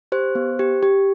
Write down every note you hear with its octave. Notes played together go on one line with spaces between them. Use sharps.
G4 C5
B3
G4
G4